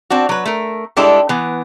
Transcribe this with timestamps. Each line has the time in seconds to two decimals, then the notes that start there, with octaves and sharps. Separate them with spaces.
0.10 C4 D4 F#4
0.29 F#3 B4
0.45 A3 A#4
0.96 G3 G#3 D4 E4 G4 A4
1.29 E3 B3